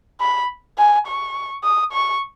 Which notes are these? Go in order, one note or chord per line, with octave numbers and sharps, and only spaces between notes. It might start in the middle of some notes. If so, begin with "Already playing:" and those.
B5
G#5
C#6
D#6
C#6